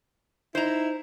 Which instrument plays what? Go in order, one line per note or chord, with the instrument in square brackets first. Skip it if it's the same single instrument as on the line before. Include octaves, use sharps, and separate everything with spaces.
[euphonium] D#4 [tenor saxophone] E4 [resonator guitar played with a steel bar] C5 A#5